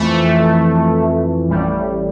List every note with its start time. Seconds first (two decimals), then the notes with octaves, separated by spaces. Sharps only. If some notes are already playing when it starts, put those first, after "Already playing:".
Already playing: F2 E3 A3
1.48 A1 A2 G3